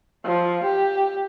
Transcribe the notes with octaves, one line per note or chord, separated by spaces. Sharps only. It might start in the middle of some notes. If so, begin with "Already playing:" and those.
F3
G4